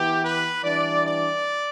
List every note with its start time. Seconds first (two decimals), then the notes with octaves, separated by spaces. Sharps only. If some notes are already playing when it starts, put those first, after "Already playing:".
Already playing: E3 B3 E4 G4
0.23 B4
0.64 E3 G3 D4 D5
1.05 D5